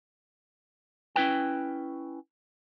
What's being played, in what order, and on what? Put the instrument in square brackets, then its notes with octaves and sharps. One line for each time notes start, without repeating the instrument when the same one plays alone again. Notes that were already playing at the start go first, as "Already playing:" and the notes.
[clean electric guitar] C#4 E4 B4 G5